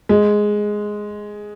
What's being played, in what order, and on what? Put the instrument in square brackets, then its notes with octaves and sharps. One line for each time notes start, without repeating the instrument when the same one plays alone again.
[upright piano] G#3